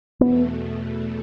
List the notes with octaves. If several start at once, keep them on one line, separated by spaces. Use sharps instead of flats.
E2 B2 A3 B3